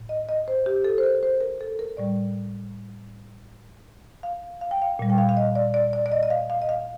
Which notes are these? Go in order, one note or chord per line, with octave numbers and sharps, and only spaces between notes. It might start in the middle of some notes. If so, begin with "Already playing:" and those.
Already playing: A2
D#5
D#5
C5
G4
A4
C5
A#4
C5
A#4
A4
A#4
A2 G3 D5
F5
F5
G5
F5
A#2 G3
G5
F5
F5
D#5
D5
D5
D5
D5
D#5
D#5
F5
F5
D#5
F5